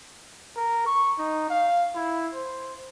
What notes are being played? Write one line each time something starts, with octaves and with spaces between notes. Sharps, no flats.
A#4
C#6
D#4
F5
E4
C5